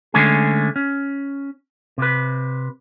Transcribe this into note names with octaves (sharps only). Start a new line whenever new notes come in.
D3 G#3 A3 C#4 G#4
C#4
C3 B4